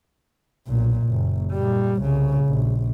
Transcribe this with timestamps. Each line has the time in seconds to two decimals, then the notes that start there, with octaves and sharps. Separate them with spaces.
0.68 B1 A#2
1.05 F#1
1.52 A#2 G3
2.01 C2 C#3
2.45 A#1